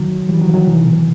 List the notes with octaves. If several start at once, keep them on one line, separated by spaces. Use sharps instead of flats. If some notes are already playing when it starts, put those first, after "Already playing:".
Already playing: D#3 F#3
E3 G3
D#3 F#3
D#3 F#3
C3 E3
B2 D#3